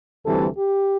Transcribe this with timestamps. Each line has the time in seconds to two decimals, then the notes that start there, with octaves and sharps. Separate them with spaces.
0.25 D2 C3 E3 G3 A4
0.56 G4